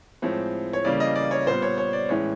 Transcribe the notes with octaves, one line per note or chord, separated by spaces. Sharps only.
A2 F3 G#3 C4 C#5
C#5
C#3 E3 G3 A#3 C#4 D5
D#5
D5
C#5
A#2 G3 B3 C5
C#5
C#5
D5
A2 E3 G#3 C#4 C#5